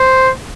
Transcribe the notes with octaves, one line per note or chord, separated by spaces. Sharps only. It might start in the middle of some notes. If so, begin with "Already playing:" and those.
Already playing: C5